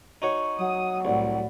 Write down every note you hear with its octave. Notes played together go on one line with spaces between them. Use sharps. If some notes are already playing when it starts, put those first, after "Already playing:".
D#4 F#4 C#5
F#3 D#6
C2 A2 F#4 D5 F#5